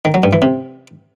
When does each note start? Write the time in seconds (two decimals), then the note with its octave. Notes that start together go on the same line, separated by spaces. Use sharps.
0.05 D#3
0.14 F#3
0.23 G2
0.33 E3
0.42 C3